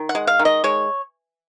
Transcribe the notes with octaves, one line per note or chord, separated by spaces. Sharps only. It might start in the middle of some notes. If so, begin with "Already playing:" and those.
Already playing: D#3
F#5
G#3
F5
D#3
D#5
G#3 C#5